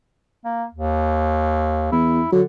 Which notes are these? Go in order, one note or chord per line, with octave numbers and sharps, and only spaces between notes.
A#3
D#2
E2 E4
D3 F#3